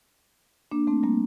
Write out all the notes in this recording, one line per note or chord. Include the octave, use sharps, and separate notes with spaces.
A#3 D4
A3 C4
G3 A#3